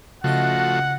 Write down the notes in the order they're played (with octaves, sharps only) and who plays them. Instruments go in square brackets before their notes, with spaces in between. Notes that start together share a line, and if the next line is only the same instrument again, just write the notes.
[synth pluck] C#3 D#5 A#6 [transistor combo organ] F3 A3 F#4 [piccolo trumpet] F#5